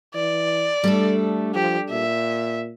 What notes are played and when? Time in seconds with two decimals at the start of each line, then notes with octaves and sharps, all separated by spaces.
0.14 E3 D5
0.84 G3 A3 D4 A4
1.55 F3 G4
1.90 A#2 E5